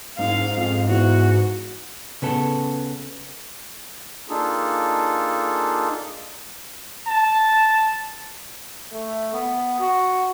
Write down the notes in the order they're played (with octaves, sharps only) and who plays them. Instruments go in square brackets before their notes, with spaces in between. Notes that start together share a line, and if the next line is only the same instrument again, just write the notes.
[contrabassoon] F#1 [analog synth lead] G#2 [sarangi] F5
[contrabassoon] F2
[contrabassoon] E2 [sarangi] F#4
[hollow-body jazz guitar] C#3 B3 A4
[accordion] A#3 D4 D#4 F4 G#4 A4
[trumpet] A5
[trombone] A3
B3
F#4